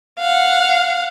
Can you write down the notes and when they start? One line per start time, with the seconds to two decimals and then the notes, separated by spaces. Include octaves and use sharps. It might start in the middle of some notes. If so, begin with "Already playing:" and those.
0.19 F5 F#5